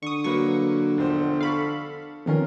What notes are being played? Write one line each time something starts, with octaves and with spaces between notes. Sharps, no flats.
D3 C#6 D#6
F#3 A#3 B4 C#6
E1 F3 C5
A4 F5 B5 C#6
F2 D#3 B3 C#4 F4 A#4